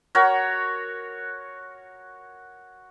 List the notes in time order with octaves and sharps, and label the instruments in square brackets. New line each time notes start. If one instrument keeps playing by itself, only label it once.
[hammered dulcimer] F#4 A#4 C#5